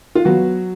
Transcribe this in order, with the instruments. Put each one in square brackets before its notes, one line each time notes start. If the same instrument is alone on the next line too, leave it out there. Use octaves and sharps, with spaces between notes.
[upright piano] F4
F#3 B3 F#4